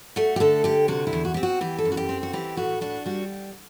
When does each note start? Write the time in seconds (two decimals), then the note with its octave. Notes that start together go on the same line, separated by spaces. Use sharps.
0.16 A3 F#4
0.36 G4
0.40 D3 A4
0.64 D3 G4
0.88 C3 F#4
1.07 E4
1.13 E2
1.25 F#4
1.34 C4 G4
1.43 F#4
1.61 E3 G4
1.78 A4
1.85 F#2
1.92 F#4
1.97 G4
2.09 C4
2.23 F#4
2.33 E3 G4
2.57 A2 F#4
2.81 D4 F#4
3.06 G3 F#4